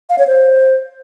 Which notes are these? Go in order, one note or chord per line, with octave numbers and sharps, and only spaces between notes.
F5
C#5
C5